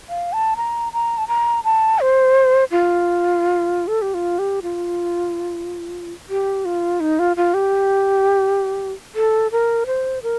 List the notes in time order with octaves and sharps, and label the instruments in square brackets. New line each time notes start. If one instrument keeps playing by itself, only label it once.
[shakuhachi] F5
A5
A#5
A#5
A5
A#5
A5
C5
F4
A4
G4
F4
G4
F4
G4
F4
D#4
F4
F4
G4
A4
A#4
C5
A#4